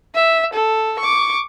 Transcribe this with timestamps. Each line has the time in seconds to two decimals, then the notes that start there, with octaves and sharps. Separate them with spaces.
0.15 E5
0.54 A4
1.00 C#6 D6